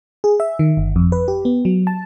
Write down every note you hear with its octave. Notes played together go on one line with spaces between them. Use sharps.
G#4
E5
D#3
G1
F2
B4
G4
B3
F#3
A5